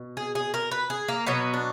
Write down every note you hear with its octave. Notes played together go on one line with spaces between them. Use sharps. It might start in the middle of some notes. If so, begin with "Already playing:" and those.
Already playing: B2
G#4
G#4
A#4
B4
G#4
A#3
B2 F#3 B3
D4